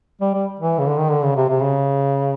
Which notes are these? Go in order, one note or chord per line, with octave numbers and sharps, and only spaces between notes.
G3
G3
E3
C#3
D3
D#3
D3
C#3
C3
C3
C#3